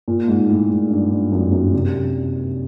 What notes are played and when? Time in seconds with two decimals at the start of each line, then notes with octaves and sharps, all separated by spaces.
0.08 A#2
0.28 G#2
0.49 A2
0.70 G#2
0.90 G2
1.12 G2
1.32 F#2
1.52 F#2
1.73 C3